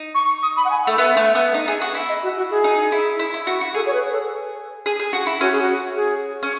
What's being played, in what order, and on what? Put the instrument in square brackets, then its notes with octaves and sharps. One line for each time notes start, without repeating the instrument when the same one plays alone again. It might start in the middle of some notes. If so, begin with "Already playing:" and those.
Already playing: [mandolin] D#4
[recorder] C#6
D#6
B5
F#5
G#5
F#5
[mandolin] A3
[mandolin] B3 [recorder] E5
[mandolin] A3
B3
D#4
G#4
F#4
E4
[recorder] D#5
F#4
F#4
G#4
[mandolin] D#4
E4
E4
E4
F#4
F#4
[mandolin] G#4 [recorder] A4
[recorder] C#5
B4
A4
[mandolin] G#4
G#4
F#4
E4
[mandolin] C#4 [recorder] F#4
[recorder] G#4
F#4
G#4
[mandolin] C#4